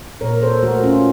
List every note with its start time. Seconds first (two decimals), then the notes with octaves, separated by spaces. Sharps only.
0.21 A#2 A#4 C#5
0.42 A4 C5
0.63 A3 F#4 A#4
0.83 C#4 F4